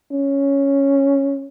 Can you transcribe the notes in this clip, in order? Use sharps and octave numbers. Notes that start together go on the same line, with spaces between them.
C#4